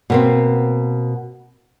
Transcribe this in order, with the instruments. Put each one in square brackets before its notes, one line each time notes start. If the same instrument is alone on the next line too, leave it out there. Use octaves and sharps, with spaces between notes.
[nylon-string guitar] B2 A#3 C4